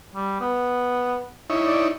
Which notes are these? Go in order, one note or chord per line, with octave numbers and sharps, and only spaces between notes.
G3
B3
D#4 E4 C#5
D5